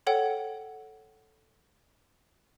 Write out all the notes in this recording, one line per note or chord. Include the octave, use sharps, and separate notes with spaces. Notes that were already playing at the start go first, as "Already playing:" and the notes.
A4 C#5 F#5 G5